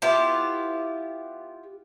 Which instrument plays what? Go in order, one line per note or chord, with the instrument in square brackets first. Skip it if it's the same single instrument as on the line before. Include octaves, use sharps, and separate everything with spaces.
[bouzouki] B3 E4 F4 G4